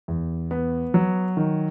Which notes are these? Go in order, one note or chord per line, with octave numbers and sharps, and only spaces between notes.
E2
B3
F#3
D#3